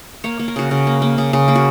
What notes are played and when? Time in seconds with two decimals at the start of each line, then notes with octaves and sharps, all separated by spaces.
0.24 A#3 C#5
0.39 A#3
0.48 A#4
0.56 C#3 F#4
0.71 C#3
0.87 A#3
1.02 A#3
1.18 C#3
1.33 C#3
1.48 A#3
1.55 F#4